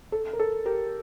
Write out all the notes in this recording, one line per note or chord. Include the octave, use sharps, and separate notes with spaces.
A4
A#4
A4
G4 A#4